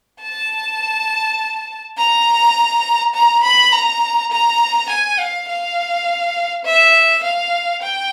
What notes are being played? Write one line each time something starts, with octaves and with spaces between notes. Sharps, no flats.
A5
A#5
A#5
B5
A#5
A#5
G#5
F5
F5
E5
F5
G5